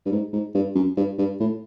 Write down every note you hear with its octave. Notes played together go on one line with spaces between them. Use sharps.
G2
G#2
G#2
G2
F#2
G2
G2
A2